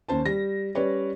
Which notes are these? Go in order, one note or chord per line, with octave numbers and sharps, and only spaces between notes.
D#2 C#4 C5 A5
G3 A#6
G3 C#4 B4 C#5 D5